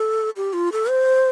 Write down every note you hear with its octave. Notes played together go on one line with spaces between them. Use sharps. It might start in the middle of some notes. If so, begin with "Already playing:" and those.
Already playing: A4
G4
F4
A4
C5